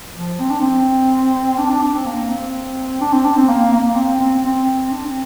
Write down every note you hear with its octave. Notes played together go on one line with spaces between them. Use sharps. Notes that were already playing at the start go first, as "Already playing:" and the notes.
F3
C4
D4
C4
D4
D4
D4
C4
A#3
C4
D4
C4
D4
C4
A#3
A#3
C4
C4
C4
D4
C4